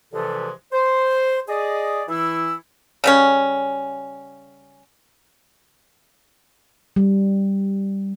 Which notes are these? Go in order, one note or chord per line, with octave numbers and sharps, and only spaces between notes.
C2 C3 E3 F3 G#3 A4
C5
G#4 D5 D#5
E3 E4 E6
C#3 G3 C#4
G3